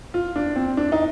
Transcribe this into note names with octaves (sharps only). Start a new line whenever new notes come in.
F4
D4
C4
D4
D#4